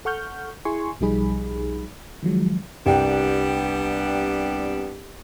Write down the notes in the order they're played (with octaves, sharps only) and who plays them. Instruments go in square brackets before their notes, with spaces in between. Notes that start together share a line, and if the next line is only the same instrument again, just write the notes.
[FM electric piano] A4 F#5 C#6 F6 G6
E4 G#4 G#5 C6 C#6
B1 F3 G3 D#4 G#4 B5
D#3 F3 F#3 G#3
[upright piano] C2 G5 [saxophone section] G3 B3 D4